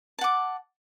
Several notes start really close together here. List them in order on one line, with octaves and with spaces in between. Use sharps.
A5 F#5 D6